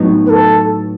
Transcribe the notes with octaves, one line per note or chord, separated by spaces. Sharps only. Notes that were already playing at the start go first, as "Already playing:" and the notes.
Already playing: A2 F#3 B3 D#4
B4
A4